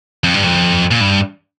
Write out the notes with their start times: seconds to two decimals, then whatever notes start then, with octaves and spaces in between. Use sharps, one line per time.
0.24 F2
0.34 G2
0.44 F2
0.91 A#2
1.01 G2